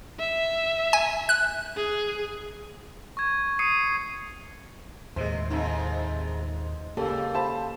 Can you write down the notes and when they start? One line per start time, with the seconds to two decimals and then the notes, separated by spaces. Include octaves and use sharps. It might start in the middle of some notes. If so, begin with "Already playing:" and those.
0.19 E5
0.93 G#5
1.29 F#6
1.77 G#4
3.17 C#6 G#6
3.59 C#6 D#6 C7 C#7 D#7
5.16 D#2 A2 C3 G#3 C5
5.50 F2 G#2 C3 D#4
6.97 C#3 A#3 G4 A4
7.34 C5 A5 B5